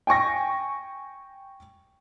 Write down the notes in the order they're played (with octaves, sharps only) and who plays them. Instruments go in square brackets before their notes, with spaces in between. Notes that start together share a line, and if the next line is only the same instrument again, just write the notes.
[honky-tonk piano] G5 G#5 C#6 A#6